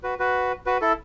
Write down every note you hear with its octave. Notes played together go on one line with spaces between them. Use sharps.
F#4 B4
F#4 B4
F#4 B4
E4 A4